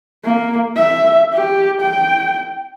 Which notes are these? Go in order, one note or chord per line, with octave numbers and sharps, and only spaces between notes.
A#3
E5
G4
G5